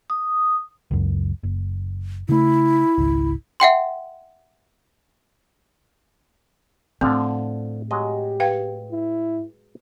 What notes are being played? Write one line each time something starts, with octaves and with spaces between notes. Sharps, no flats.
D#6
C#2 F#2
F#1
C#3 A3 E4
G#1 C#2
E5 F#5 G5 C6
A2 D3 F3 C4
F#3 G#3 G4 D#5
B4 F5 G5
E4